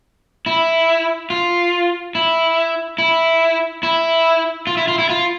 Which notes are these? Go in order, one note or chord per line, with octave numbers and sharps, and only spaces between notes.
E4
F4
E4
E4
E4
F4
E4
F4
E4
F4